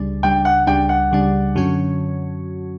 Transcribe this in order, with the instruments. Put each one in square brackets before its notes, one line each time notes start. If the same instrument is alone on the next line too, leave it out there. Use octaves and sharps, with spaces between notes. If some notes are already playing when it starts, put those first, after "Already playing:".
Already playing: [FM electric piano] C#2 C#3 G3 D4
[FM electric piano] C#2 C#3 G3 D4 [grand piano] G5
[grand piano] F#5
[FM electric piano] C#2 C#3 G3 D4 [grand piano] G5
[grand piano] F#5
[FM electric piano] C#2 C#3 G3 D4
F#2 D3 F#3 C#4 F#4